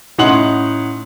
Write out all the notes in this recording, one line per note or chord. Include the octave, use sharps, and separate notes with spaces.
A2 C#4 D#4 F#5 C6 F#7